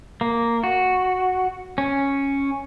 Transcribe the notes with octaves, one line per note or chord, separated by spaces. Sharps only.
A#3
F#4
C#4